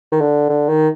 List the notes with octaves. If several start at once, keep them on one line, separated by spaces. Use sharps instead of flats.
D#3
D3
D3
D#3